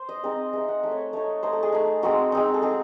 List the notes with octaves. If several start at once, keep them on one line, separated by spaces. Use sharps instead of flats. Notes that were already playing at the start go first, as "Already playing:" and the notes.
Already playing: C5
D#5
G#3 C4 D#4
G#3 C4 D#4 E5
F#5
A3 D#4 E5
C#5
D#5
A3 D#4 C#5
A3 D#4 C5
A4
G#4
A3 D#4
G#3 C4 D#4 F#4
G#3 C4 D#4
A4
G#3 C4 D#4 G#4